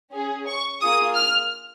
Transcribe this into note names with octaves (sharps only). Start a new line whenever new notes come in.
C#4 G#4
C#6
A#3 F4 G#4 D#6
F6